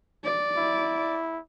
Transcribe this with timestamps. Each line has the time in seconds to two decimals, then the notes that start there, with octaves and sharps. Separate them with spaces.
0.24 D5
0.57 E4